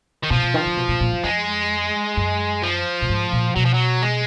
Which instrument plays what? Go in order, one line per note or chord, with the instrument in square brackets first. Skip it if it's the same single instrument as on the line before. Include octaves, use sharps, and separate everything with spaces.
[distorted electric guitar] D#3
[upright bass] B2 [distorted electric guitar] F3
[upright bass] B2
D#3
D3
B2
A#2
A#2
F#2
[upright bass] F2 [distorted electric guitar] G#3
[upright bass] F#2
[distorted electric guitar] F3
[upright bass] A#2
G#2
A#2
[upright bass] B2 [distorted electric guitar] F#3
[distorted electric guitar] F3
F#3
G#3